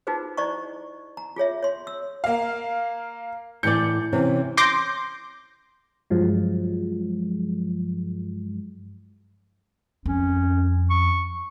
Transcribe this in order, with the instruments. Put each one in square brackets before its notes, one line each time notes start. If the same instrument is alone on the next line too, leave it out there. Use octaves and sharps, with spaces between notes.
[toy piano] D#4 F4 F#4 G#4 B4 C5
E4 C5 D5 D#5 A#5 C#6
A#5
F4 G#4 C#5 E5
C#5 C6
E6
[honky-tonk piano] A#3 F5
[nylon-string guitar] A2 E3 D5 [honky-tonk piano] G6 C#7
[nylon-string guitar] C3 E3 C#4
[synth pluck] C6 D6 G6 A#6
[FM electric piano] G2 F3 F#3 G#3
[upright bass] F2 [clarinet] C#4
[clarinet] C#6